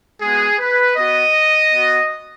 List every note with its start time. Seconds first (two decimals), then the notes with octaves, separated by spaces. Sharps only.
0.21 G#3 B3 F#4 G#4
0.59 B4
0.97 B3 F#4 D#5
1.72 B3 F#4